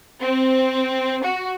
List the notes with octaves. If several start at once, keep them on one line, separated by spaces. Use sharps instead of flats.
C4
F#4